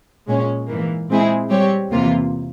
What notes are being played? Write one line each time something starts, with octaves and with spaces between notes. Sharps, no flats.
A#2 G#3 C#4
G#2 E3 A#3
A#2 G#3 C4 E4 G#4
G3 C4 G4 C#5
E2 C3 E3 A#3 F4